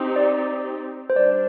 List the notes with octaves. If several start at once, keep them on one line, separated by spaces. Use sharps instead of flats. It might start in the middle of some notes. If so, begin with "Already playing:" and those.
Already playing: C4 D#4 G4
D5
C5
G3 D4 D5